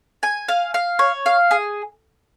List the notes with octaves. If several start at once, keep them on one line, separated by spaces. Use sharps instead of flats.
G#5
F5
F5
C#5
F5
G#4